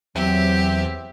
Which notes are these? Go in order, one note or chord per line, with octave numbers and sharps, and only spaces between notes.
E2 F#3 C4 G4 E5